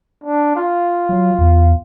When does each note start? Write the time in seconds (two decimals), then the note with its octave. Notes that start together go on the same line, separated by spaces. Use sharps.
0.24 D4
0.56 F4
1.09 F#3
1.38 E2